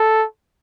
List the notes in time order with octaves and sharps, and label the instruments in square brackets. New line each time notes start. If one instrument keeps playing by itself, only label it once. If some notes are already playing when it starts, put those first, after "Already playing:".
Already playing: [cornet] A4